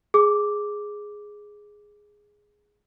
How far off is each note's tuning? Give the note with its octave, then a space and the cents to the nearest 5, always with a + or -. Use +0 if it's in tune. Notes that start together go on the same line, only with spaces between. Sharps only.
G#4 +0 D6 +0